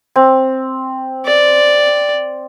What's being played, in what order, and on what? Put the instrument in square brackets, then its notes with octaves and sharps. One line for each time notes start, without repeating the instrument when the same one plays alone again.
[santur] C4
[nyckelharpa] D5